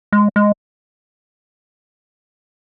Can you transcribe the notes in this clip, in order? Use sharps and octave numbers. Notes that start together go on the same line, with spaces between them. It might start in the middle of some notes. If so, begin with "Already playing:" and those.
G#3
G#3